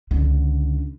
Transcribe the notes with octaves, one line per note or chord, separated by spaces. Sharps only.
C#2 D3